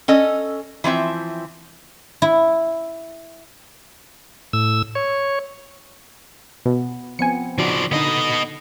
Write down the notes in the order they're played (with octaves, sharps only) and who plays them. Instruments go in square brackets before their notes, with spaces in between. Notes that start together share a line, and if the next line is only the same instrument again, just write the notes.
[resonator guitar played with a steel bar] C#4 A4 D#5
E3 F3 C4 E5
[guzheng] E4
[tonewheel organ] A2 E6
C#5
[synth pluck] B2 [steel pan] B3
[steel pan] F3 B3 C4 [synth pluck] G#5 C#7
[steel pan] C#3 D#4 F#4 [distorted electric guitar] F3 D5
[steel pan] D3 D#4 [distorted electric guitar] B3 D#5